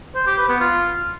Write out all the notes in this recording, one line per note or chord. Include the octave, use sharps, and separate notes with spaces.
C5
G4
B4
B3
F4